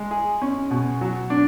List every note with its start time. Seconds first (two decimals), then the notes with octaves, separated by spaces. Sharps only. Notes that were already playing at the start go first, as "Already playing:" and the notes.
Already playing: G#3
0.11 G#4
0.42 C#4
0.71 B2
1.01 F#3
1.30 D4